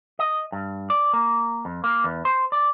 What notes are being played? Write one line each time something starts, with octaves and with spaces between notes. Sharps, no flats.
D#5
G2
D5
A#3
F2
A#3
E2
C5
D5